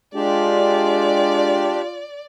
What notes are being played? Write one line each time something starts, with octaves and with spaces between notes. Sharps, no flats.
G#3 D4 F4 G4 D5